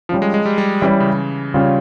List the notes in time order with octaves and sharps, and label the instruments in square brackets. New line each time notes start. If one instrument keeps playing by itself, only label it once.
[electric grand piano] F3 [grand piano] G3 C#4 F4
[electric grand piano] G#3
G#3
G3
G3
[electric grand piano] E3 [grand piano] G3 C#4 E4
[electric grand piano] C#3
[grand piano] C#3 G3 C#4 F4